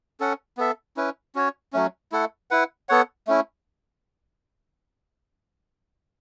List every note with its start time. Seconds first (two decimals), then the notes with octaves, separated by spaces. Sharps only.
0.20 C#4 A4 F#5
0.57 B3 A4 E5
0.97 C#4 E4 B4
1.35 C#4 F#4 C#5
1.73 F#3 A3 C#4
2.12 A3 E4 A4 F#5
2.51 E4 B4 F#5
2.89 B3 A4 C#5 F#5
3.27 A3 C#4 E4